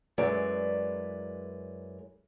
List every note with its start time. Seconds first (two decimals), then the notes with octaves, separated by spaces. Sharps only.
0.18 F#2 G#3 E4 B4 D5 A#5